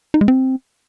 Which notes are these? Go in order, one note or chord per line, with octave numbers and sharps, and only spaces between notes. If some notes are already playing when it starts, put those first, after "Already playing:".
D#4
G#3
C4